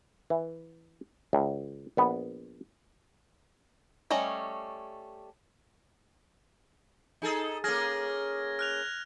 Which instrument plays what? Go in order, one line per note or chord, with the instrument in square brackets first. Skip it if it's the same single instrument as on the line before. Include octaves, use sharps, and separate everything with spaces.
[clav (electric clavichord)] E3
C#2
A#1 B3
[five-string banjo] G3 A3 C#4 D#5
[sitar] D#4 G#4 A4
[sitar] A#3 C#4 G#4 [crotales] F6 G#6 A#6
[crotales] F6 F#6 F7